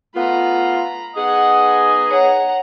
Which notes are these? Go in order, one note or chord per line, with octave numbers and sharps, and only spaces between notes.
A3 B3 F4 A#5 B5
B3 D#4 G#4 D#5 F#5
C#5 F#5 A#5